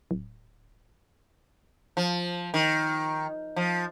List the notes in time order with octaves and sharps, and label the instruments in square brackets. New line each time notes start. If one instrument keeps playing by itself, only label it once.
[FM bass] D1
[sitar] F3
D#3
F3